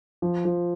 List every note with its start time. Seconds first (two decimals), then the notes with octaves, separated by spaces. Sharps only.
0.22 F3
0.45 F3